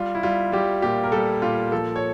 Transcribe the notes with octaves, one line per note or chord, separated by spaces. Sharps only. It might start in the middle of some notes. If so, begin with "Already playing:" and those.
Already playing: G3 F4
E4
G3 F4
G3 G4
A#2 G4
A#4
G3 A4
A#2 F4
F3 A4
C#5